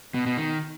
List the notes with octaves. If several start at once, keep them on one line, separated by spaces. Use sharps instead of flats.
B2
B2
D#3